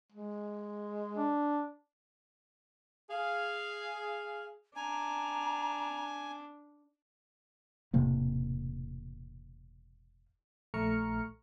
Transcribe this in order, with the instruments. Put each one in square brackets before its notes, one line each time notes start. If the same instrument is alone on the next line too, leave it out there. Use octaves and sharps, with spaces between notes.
[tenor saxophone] G#3
[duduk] D4
[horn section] G#4 F5
[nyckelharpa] D4 [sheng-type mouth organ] G#5 [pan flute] A#5
[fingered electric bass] E1 A2 C3 A#3
[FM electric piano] A#1 A3 A#5 C#6 F6 C#7